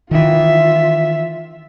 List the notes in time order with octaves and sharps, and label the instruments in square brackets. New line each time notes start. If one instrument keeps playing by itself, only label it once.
[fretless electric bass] D#3 E3 [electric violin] F4 E5